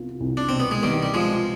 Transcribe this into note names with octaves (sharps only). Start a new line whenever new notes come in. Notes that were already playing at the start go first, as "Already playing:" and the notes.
Already playing: C2 B3 F4
C2
D4
B2 C4
B3
G#3
D#3 G3 B3
G3
F3 G#3 F4